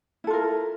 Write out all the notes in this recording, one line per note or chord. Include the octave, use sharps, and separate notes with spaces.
E4 F4 A4 A#4